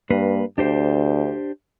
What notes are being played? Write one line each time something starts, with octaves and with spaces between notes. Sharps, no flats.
G2 A#3 B4
D2 D4 G4 C5